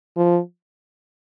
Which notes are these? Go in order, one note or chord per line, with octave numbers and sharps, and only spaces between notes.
F3